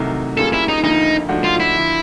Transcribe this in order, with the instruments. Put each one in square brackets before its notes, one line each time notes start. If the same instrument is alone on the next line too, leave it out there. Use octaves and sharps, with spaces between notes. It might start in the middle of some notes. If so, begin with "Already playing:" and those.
Already playing: [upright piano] C2 C3 D#3 F#3 A3
[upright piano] G3 A#3 C#4 F4 G#4 [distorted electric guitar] A4
[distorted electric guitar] E4
D#4
[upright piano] D2 D3 F3 A#3 [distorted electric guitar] D#4
[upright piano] G#2 F3 A3 D4 F#4
[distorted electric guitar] F4
E4
[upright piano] D3 F3